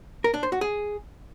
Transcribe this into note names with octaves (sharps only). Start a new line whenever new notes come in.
A#4
D4
C5
F#4
G#4